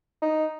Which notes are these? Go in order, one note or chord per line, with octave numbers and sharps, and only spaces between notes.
D#4